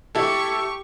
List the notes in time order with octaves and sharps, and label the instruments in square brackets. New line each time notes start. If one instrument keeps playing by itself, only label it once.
[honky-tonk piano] E4 A4 [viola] G4 C#6